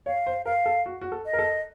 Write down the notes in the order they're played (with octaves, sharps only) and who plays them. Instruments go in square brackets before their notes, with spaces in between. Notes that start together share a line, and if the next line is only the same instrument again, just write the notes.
[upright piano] C#5 [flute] F5
[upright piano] C5
[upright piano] A#4 [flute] F5
[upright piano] A4
F#4
F#4
A4
[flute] D#5
[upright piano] A#4
A4